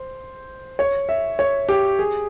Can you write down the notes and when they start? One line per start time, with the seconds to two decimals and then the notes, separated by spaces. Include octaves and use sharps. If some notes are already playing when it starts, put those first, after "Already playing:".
Already playing: C5
0.79 C#5
1.09 E5
1.39 C#5
1.69 G4
1.99 G#4